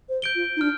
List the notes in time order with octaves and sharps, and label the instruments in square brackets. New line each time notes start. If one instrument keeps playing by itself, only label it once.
[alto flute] C5
[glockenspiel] G6 D7 G7
[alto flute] F4
D#4
[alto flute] D4 [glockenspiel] F6